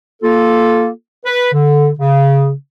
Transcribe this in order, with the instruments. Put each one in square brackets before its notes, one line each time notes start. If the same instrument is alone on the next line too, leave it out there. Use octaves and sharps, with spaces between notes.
[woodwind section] A#3 F4 A4
B4
D3
C#3